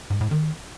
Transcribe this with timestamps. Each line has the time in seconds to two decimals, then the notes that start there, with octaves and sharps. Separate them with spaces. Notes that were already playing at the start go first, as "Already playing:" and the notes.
0.10 G#2
0.21 A2
0.31 D#3